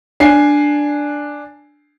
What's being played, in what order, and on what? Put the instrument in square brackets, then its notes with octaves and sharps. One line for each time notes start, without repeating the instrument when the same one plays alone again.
[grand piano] D4 G#5 C7